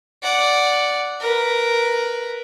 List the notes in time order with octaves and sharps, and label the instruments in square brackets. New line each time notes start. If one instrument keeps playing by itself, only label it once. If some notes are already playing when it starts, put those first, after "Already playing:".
[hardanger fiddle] D5 F#5
A#4 B4